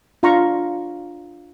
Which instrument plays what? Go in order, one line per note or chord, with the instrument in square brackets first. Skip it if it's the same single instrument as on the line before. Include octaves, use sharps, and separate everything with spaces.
[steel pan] D4 F4 F5 A#5 C6 C#6